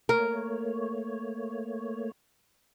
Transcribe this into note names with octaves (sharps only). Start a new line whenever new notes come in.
A3 A#3 A#4 C#5